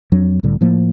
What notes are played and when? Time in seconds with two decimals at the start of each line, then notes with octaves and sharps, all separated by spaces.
0.12 F2 F#3 D4
0.43 C2 A2 D3 G3
0.61 A2 F3 A#3